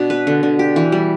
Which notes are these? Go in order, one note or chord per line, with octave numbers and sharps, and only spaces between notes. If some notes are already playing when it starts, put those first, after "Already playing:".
Already playing: B2 D4
B4
D3
D3
G4
E3
G3